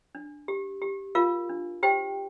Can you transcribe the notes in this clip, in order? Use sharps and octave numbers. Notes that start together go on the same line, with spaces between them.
D4
G4
G4
F4 A#4 F5
D4
G4 C5 G5